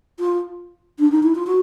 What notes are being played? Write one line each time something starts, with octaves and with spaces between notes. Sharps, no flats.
F4
D4
D#4
E4
F4
F#4